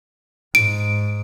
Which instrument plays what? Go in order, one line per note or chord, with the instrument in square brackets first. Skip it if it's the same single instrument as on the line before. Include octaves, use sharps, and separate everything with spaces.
[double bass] G#2 [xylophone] D7